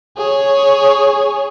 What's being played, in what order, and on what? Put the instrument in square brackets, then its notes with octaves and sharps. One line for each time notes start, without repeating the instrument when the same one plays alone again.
[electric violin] G#4 C#5